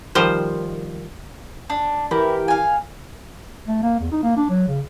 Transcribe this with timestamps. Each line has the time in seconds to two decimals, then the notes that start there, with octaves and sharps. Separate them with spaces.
0.15 D#3 F3 G3 F4 C5
1.70 D4
2.11 E3 E4 G4 A#4
2.48 F5 G#5
3.68 A3
3.83 A#3
4.00 E2
4.12 D#4
4.23 A#3
4.36 D4
4.49 F#3
4.67 C#3